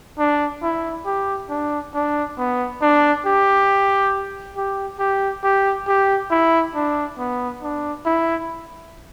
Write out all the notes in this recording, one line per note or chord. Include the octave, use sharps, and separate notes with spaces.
D4
E4
G4
D4
D4
B3
D4
G4
G4
G4
G4
G4
E4
D4
B3
D4
E4